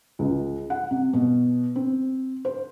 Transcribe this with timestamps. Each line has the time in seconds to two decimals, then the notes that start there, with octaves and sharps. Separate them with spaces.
0.19 C#2
0.70 F#5
0.91 C3
1.13 B2
1.75 C4
2.45 C5